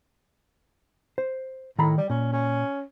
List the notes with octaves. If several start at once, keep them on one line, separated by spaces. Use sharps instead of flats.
C5
A2 D#3 A#5 B5
G3
A#2 C#4
C#4